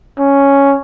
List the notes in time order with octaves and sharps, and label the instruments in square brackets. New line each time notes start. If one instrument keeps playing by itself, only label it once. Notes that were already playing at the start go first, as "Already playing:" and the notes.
[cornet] C#4